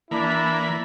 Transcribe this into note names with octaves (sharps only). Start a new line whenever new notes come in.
E3 A#3 D4 E4 B5